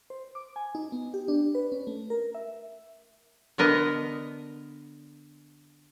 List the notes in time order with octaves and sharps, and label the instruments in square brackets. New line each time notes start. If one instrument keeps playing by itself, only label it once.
[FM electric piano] C5
D6
G#5
D#4
B3
G4
D4
B4
C#4
A3
A#4
E5
[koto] D3 B3 A#4 D#5